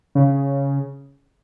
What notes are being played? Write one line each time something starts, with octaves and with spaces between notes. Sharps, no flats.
C#3